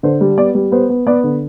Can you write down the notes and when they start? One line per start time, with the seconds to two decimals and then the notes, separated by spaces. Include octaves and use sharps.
0.03 D3 C5
0.21 G3
0.38 B3 D5
0.55 G3
0.72 B3 C5
0.90 B3
1.07 B3 D5
1.24 D3